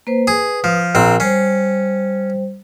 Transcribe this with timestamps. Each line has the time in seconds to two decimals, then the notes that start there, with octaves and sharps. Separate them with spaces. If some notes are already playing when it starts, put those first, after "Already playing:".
0.07 A#3 B4 C5
0.27 G#4 B4 D#6
0.64 F3
0.95 A#1 C4 A#5
1.20 G3 C#4 C5